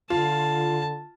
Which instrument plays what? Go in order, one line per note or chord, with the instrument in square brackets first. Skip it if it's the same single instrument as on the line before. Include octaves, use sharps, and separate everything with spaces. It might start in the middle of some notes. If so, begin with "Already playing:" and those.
[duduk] D3 [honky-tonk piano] F4 [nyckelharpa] A5